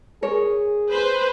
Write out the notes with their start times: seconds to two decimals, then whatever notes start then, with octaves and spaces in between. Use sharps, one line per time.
0.22 G#4 A#4 C#5
0.91 B4 C5